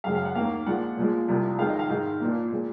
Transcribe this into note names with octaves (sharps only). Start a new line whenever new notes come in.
F#2 C#3 G#3 F5
F5
F#5
D#2 D#3 A#3 F5
A#2 F3 G#3 F#5
A#2 F3 G#3
C2 C3 F3
F2 D#3 G#3 F5
D#5
F5
G#2 D#3 G#3 F5
A#2 F3 A#3
A#2 G#3